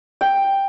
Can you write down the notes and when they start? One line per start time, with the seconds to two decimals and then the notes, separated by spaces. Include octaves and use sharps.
0.21 G5